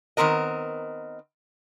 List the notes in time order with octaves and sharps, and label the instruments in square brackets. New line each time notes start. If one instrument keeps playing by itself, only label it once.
[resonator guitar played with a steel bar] D#3 B3 C4 A#4 D#5